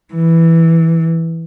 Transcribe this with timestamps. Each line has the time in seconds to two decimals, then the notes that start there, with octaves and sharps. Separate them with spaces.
0.14 E3